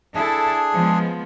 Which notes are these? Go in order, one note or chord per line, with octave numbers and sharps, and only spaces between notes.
D4 E4 G#4 A4
F3 G#3 B3